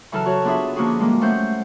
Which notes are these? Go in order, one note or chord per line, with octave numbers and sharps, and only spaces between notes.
C#3 E3 F#3 A4 A5 F6
F#4 C#5
B3 D4 F4 G#4 E5 B5
D3 F3 A#3 C#4 F#4 G#4
G3 G#3 A#3
A3 C#4 C5 F#5 G6